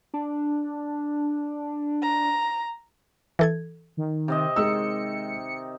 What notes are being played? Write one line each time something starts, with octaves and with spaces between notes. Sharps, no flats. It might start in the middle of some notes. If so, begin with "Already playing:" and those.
D4
A#5
E3 A4 G#6
D#3
C3 C4 D#5
D#3 G#3 E6 C#7